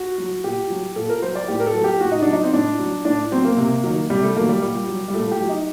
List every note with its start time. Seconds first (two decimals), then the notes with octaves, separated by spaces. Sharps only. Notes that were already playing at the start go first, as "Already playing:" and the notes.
Already playing: F#4
0.18 F#3
0.44 A#2 G4
0.70 F#3
0.96 A#2 A4
1.09 A#4
1.22 F#3 C5
1.35 D5
1.48 A2 G4
1.60 A#4
1.66 A4
1.75 F#3
1.84 G4
2.00 A2 F#4
2.11 D#4
2.22 F#3 D4
2.33 D#4
2.43 C4
2.53 A2 D4
2.79 F#3
3.05 A2 D4
3.31 F#3 C4
3.45 A#3
3.57 C3
3.83 D#3 F#3
4.10 C3 G3
4.23 A3
4.36 D#3 F#3 A#3
4.49 G3
4.62 A#2 G3
4.88 F#3
5.08 G3
5.14 A#2 A3
5.31 G4
5.40 F#3
5.49 D#4